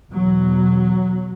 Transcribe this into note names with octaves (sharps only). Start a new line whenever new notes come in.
E2 B2 F#3